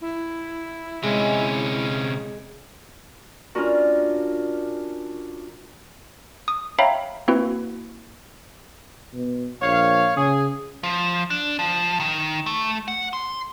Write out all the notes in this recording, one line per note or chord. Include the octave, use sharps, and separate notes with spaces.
E4
C3 G#3 C#4
C#4 D4 F4 F#4 A#4
D#6
C#5 E5 F5 G5 A#5 B5
A#3 C4 E4 F#4 B4
B2
A#1 C#5 F5
C#3 G#4
F3
D4
F3
D#3
A3
F#5
C6